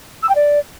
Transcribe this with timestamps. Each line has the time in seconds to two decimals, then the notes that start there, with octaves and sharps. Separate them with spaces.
0.23 E6
0.29 G5
0.35 D5